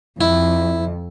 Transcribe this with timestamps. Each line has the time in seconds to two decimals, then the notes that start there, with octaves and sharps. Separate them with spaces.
0.21 F2 E4